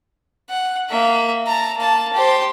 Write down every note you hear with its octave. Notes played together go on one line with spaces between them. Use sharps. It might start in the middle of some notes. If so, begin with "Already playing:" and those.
F#5
A#3 E5
A5 A#5
A#3 A5
G4 C5